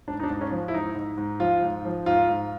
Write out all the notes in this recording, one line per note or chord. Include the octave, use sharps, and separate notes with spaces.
G#2 D4
D#4
D4
G#2
C#4
F3
E4
G#2 D#4
G#2
G#2
F3 F4
G#2
F3
G#2 F4
G#2